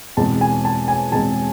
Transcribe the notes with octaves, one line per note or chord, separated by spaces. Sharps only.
E2 B2 G#3 C4 A5
G#5
A5
G#5
E2 B2 G#3 C4 A5